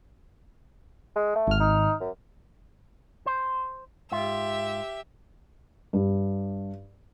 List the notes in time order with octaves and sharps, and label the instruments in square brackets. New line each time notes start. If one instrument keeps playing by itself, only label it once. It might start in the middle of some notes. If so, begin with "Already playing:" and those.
[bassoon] G#3
A3
[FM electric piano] G#1 F6
[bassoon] D#4
F#2
[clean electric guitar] C5
[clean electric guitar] G#2 F4 [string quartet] G4 E5
[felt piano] G2